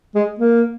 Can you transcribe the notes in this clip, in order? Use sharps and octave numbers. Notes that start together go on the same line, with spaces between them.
G#3
A#3